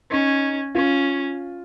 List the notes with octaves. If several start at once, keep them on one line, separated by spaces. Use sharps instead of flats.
C#4 D#4
C#4 F4